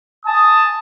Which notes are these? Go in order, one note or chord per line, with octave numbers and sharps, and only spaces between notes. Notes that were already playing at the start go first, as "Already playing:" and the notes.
G#5 A5 D#6